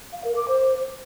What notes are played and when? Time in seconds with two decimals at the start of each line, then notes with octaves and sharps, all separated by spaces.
0.13 F5
0.24 A#4
0.36 D6
0.48 C5